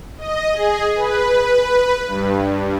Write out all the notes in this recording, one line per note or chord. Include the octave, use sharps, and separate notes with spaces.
D#5
G#4
B4
G2